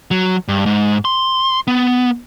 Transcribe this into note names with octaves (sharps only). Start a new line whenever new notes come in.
F#3
G2
G#2
C6
B3